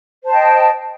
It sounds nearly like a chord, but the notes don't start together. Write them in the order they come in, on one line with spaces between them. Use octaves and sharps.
C5 A5 D#5 G5